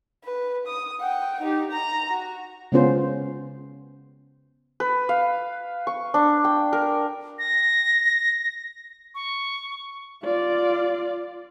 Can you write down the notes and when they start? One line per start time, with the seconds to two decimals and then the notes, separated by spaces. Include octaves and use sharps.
0.24 B4
0.67 D#6
1.00 F#5 G5
1.41 D#4 G4
1.71 A#5
2.10 F#4
2.72 C#3 G#3 B3 C#4 F4 C5
4.80 B4
5.09 F5
5.87 C#6
6.14 D4
6.44 G5
6.73 A#4
7.39 A#6
9.15 C#6
10.23 F4 D5